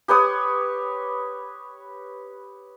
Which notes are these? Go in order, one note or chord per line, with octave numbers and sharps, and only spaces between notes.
G4 B4 C#5 D#6